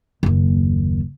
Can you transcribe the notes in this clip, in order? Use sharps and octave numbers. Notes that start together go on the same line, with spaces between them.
F#1 D#2